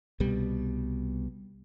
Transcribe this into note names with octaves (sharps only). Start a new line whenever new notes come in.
C2 B2 G3